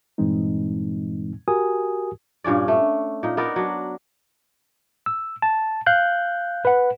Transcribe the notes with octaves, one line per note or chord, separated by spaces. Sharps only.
G2 A#2 E3 G#3 C4 D#4
F#4 G4 A#4 G#5 D#6
G2 A#2 C#4 D5
A3
A#2 D#4
B3 D#4 A#4 D5
F#3 D4
E6
A5
F5 F#6 G6
B4 F#5